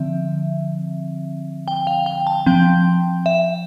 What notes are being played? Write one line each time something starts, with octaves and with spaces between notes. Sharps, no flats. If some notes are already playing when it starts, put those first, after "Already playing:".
Already playing: D3 F3 C4 E5
G5
F5
G5
A5
F3 C4 G5
E5